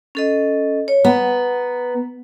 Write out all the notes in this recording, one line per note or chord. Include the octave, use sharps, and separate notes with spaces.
C#4 A4 D#5
C#5
B3 A#5